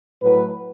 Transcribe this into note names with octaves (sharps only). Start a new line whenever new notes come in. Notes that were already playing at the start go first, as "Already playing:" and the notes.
A2 F#3 B4